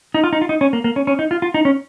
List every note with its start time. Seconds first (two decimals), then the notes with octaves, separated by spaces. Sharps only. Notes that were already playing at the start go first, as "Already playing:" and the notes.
0.14 D#4
0.24 F4
0.33 D#4
0.42 F4
0.49 D#4
0.61 C#4
0.73 A#3
0.84 A#3
0.96 C#4
1.07 C#4
1.19 D#4
1.31 F4
1.42 F4
1.54 D#4
1.65 C#4